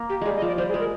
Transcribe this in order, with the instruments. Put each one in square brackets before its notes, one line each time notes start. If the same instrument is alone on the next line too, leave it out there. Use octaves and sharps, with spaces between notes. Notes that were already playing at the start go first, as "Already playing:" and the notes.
Already playing: [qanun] A#3
[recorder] G4
[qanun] G3 G#3 [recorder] G#4
[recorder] D#5
[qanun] F3
[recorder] D5
[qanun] G3 [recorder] C5
[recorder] G#4
[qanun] G#3
[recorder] A#4